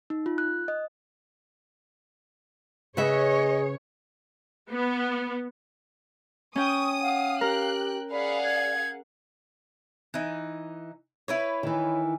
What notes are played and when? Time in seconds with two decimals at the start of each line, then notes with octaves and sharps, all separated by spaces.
0.10 D#4
0.26 F4
0.38 F#6
0.68 D#5
2.97 C#3 G#4 B4 C#5 D#5 E5
4.72 B3
6.56 C#4 G5 C#6 D#6
7.02 F5 F#5
7.41 G4 A#4 G5 F#6
8.11 G#4 D5 F5 F#5 B5
8.44 G#6
10.14 E3 D#4
11.28 E4 B4 C#5
11.63 D#3 E3